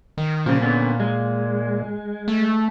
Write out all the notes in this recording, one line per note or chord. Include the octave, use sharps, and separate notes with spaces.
D#3
A#2 C#3 F3
D3 B3 C#4
G#3
A3